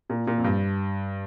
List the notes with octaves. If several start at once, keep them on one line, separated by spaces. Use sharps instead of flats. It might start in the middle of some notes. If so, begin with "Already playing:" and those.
A#2
A#2
F2
G2